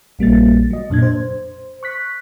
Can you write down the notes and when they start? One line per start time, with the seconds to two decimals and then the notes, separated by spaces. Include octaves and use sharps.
0.19 A#1 G3 A#3 A6
0.70 F#3 D#5
0.90 F2 A#2 D4 G#6
1.02 C5
1.83 C#6 F#6 B6